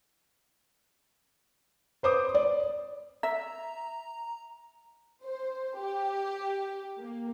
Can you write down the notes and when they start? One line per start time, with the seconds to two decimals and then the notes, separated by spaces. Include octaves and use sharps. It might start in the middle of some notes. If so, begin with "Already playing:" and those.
2.03 B4 C5 D6 D#6
2.35 D5
3.23 E5 A#5
5.24 C5
5.78 G4
7.00 A#3